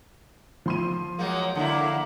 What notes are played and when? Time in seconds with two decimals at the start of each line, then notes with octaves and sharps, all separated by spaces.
0.66 F3 C6 D#7
1.19 F#3 G#3 A#3
1.55 D3 A#3 E4